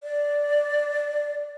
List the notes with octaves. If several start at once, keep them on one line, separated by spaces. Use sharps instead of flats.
D5